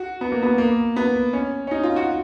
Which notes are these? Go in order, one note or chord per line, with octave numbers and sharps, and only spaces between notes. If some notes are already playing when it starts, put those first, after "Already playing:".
Already playing: F#4
B3
A#3
B3
A#3
B3
C#4
C#4
D#4
F4
F#4